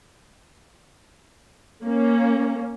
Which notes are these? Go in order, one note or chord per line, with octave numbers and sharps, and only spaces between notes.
A#3 C#4